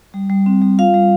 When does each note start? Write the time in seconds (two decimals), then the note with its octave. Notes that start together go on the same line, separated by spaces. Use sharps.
0.14 G3
0.30 G3
0.46 C4
0.62 G3
0.79 F4 F5
0.94 G3